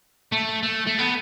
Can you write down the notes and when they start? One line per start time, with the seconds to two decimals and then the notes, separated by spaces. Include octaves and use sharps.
0.32 A3
0.63 A3
0.87 A3
0.99 B3